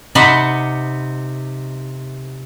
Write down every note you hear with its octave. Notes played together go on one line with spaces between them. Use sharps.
C3 D#4 F#5 B5 C6